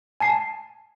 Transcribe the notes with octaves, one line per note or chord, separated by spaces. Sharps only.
G#5 A5 C7